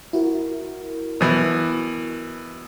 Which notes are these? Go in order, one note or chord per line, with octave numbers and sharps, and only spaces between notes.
E4 F#4 A#4
B2 E3